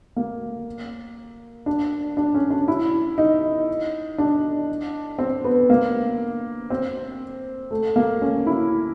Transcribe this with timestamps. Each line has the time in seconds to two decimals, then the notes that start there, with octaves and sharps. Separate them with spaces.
0.16 A#3
1.66 D4
2.17 D4
2.35 C#4
2.50 D4
2.68 E4
3.18 D#4
4.18 D4
5.19 C4
5.44 B3
5.70 A#3
6.70 C4
7.71 A3
7.96 A#3
8.22 C#4
8.46 E4